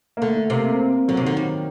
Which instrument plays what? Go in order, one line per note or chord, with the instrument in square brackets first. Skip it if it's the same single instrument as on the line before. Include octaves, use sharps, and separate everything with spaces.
[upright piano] A#3
[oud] D3 [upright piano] A3
[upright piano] A3
[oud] C3 [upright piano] A#3
[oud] D3 [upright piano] F#3
[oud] C3
[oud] D3 [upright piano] D#3
[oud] G3